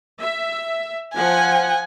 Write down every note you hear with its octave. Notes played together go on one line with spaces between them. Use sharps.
E5
F3 F#5 G#5